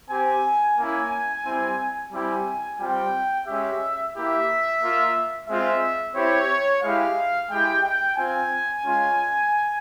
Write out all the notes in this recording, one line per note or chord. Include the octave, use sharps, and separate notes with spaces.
C4 G4 G#5
A#3 C#4 E4 G#5
G3 C4 E4
G3 C4 E4 G4 G#5
G3 C4 F4 G5
G#3 C#4 G4 E5
A#3 E4 G4 E5
A#3 F4
G#3 C4 F4 E5
C4 E4 G4 C#5
G#3 E4 G4 F5
G#3 E4 G4 G5
G5
C4 F4 G#5
G#3 C#4 F4